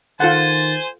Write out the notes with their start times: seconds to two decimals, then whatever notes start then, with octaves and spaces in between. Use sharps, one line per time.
0.20 D#3 F4 A4 C5 F#5 G#5 A6